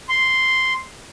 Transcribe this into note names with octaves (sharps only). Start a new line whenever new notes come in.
C6